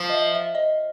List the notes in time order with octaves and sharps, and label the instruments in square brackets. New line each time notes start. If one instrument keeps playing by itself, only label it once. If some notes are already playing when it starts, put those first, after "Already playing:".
Already playing: [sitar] F3
[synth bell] D#5
E5
E5
D#5